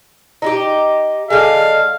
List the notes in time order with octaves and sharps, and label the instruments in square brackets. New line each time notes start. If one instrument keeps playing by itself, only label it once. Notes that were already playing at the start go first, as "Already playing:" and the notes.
[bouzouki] D#4 E4 G4
[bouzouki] D3 G#3 [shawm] F5